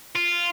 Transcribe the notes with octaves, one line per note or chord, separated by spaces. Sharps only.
F4